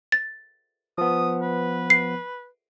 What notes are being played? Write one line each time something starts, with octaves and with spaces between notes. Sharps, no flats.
A6
F3 B3 D#6
B4
C7